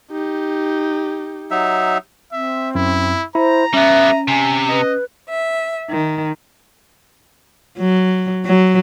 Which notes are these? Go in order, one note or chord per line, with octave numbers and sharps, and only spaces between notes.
D#4 G4
F#3 D#4 E5
C4 E5
F#2 E4
E4 C5 A#5
G3 B3 C#4 E5
C3 G#5
B4 D#5
E5
D#3
F#3
F#3